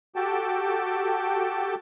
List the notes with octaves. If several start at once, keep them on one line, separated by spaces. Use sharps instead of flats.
F#4 G4 A4 G5 A5